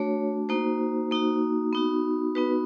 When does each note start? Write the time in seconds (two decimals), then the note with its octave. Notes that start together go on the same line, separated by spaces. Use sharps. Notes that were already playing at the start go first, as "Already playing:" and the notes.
Already playing: A3 D4 F#4 C#5
0.49 A#3 D#4 F#4 C5
1.11 A#3 D#4 F#4
1.73 B3 D#4 F#4
2.35 B3 D#4 F#4 B4